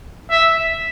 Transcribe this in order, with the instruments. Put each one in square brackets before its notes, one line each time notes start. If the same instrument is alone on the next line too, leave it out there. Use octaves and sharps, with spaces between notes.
[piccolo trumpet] E5